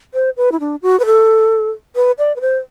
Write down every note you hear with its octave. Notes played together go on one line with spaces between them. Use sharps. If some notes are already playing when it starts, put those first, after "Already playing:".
C5
B4
E4
D4
F#4
B4
A4
B4
D5
B4
C5